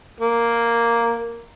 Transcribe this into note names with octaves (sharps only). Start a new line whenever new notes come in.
A#3